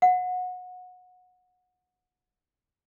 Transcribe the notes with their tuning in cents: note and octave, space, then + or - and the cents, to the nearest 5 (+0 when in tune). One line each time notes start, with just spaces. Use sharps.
F#5 -25